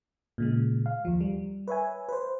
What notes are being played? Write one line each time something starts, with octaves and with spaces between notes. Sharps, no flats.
A#2 C#3 G#3
F5
D#2 F3
G3
B4 C#5 E5 G#5
B4 C5